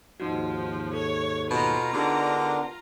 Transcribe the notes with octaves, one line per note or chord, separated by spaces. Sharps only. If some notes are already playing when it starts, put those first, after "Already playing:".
D#2 G#2 F3 D#4 F#4
A4 C#5
B2 F4 A#5
D3 B3 D4 D#4 G4 G#4 A#4